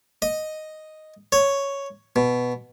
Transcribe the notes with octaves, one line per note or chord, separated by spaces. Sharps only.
D#5
C#5
B2